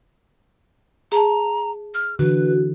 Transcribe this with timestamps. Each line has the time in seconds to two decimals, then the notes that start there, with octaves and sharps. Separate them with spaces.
1.12 G#4 A5 A#5
1.94 F6
2.19 D3 E3 F#4 B4